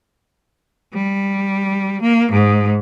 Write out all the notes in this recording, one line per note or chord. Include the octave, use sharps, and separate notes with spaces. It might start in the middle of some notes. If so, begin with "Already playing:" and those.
G3
A#3
G#2